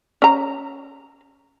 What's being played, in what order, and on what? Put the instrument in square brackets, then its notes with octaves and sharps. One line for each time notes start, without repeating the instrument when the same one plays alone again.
[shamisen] C#4 A#5